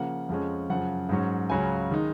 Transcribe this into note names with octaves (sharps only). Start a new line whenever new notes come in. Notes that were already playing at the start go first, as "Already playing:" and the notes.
Already playing: C#3 F3 A#3 F#5
F2 F3 G#3 C#4
F#2 C#3 F3 F#5
G#2 F#3 C#4
C#2 C#3 F#3 C#4 G#5
D#3 G#3 D#4